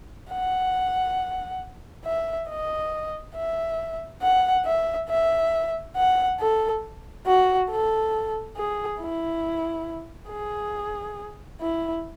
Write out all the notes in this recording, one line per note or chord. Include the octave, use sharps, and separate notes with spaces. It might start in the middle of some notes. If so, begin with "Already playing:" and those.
F#5
E5
D#5
E5
F#5
E5
E5
F#5
A4
F#4
A4
G#4
E4
G#4
E4